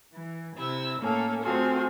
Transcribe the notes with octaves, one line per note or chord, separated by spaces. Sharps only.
E3
C3 E4 E6
A2 A#3 C#4 A4
A3 C4 F4 F#4 G#4 A4